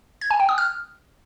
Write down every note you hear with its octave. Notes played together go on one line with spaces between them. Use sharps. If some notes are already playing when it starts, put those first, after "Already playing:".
G#6
G#5
G5
D#6
F6